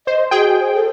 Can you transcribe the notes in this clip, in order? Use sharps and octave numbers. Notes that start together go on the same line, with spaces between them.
C5 D#5
F#4 G#4 G5
C5
A4